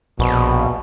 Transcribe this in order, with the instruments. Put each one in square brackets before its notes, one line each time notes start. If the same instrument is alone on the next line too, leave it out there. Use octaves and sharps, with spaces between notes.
[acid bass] A#1 [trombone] B2